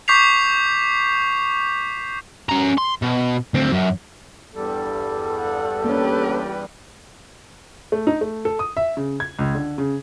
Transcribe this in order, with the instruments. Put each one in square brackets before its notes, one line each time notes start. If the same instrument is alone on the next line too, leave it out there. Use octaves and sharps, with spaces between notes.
[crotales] C#6 D6 G6 B6 C7 F7
[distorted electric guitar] C#4 A#5
C6
B2
D2 C4
F#2
[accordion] E2 G2 G3 [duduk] A4
[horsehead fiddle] F#5
[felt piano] A#3 C#4 [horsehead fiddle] G4 B4
[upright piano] A3
D#4
A3
A4
D#6
E5
C#3
G#6
C#2
D3
C#3